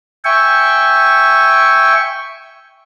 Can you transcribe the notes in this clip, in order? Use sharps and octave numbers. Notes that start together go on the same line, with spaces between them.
E5 G5 G#5 C#6